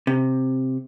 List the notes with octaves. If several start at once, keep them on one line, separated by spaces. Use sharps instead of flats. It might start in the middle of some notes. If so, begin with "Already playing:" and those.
C3